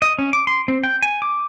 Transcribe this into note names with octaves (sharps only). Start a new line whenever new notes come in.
D#5
C#4
D6
C6
C4
G5
G#5
D6